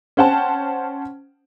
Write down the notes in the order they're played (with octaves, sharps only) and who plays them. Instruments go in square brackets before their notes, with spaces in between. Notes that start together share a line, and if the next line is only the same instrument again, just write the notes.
[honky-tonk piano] C#4 C5 F#5 G5 A5